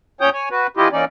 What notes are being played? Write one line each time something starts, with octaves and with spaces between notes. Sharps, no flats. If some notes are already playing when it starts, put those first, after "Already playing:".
A#2 C#4 C#5 G5 D#6 G6
C#5 G#5
F#4 B4
E3 E4 F4 G4 D#5
E3 A#3 C#4 D#4 D5